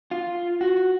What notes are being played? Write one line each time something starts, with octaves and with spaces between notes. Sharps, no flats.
F4
F#4